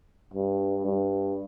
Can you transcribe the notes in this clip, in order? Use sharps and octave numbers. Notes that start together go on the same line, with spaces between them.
G2
G2